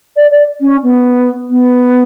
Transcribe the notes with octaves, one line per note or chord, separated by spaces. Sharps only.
D5
D5
C#4
B3
B3